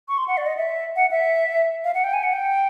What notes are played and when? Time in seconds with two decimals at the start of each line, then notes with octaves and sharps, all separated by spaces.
0.08 C#6
0.18 C6
0.28 F#5
0.37 D5
0.46 D#5
0.57 E5
0.96 F#5
1.11 E5
1.84 F5
1.94 F#5
2.04 G5
2.13 G#5
2.23 F#5
2.33 G5